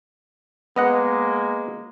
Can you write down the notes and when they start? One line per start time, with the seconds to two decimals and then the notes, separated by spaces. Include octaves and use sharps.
0.76 G#3 A#3 B3 D#5 F#5